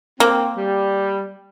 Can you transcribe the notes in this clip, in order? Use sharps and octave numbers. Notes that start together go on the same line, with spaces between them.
A#3 C4
G3